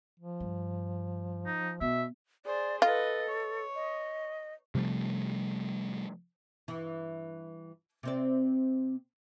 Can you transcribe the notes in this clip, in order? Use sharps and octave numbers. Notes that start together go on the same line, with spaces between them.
F3
G2
D#4
B2 B3 E5
G#4 C5 D5
F4 A4 B4 D#5
C#5
D#5
C3 F3 G3 A3
G2 E3
C3 C4 D5